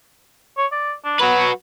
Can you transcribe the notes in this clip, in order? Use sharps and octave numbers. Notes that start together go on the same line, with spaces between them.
C#5
D5
D4
F#3 F#4 B4